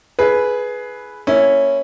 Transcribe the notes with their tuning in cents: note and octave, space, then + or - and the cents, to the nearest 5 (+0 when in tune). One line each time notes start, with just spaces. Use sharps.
E4 +10 G#4 +20 B4 +0
A#3 -25 C#4 +0 E4 +0